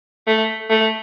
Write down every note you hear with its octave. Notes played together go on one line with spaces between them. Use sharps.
A3
A3